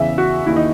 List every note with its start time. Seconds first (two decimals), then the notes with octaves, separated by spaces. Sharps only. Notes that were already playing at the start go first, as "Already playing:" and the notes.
Already playing: E2 C#3 E3 E5
0.18 F#4
0.46 D#2 D#3 E4
0.56 D#4